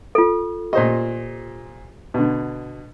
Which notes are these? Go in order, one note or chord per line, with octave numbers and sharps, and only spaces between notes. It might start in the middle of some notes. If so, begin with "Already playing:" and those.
F4 A4
A#2 G4 C5 D#5
B2 D3